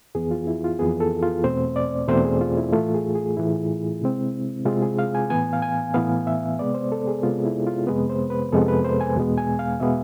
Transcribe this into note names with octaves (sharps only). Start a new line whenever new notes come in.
F2 E3 B3 G#4
F4
E4
F4
F2 E3 B3 G#4
A4
F4
E2 B2 A3 C4 C5
D5
E2 B2 A3 C4 C5
G#4
F4
E4
A2 E3 A3 F4
G#4
G#4
A2 E3 A3 E4
C3 G#3 C4
C3 G#3 C4 F4
G#4
F5
G#5
A2 E3 B3 G#5
F5
G#5
A2 E3 B3 F5
E5
C3 G#3 B3 D5
C5
A4
G#4
C3 G#3 B3 F4
E4
F4
F2 C3 G#3 B3 B4
C5
B4
F2 C3 G#3 B3 A4
B4
C5
G#5
E2 B2 G#3 B3
G#5
F5
B2 G#3 B3 E5